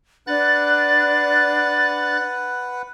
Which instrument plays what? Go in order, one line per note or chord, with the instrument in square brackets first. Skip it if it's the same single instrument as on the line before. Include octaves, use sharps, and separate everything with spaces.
[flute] D4 [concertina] B4 F#5 [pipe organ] F#6 A6